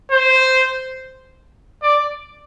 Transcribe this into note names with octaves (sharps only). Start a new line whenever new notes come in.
C5
D5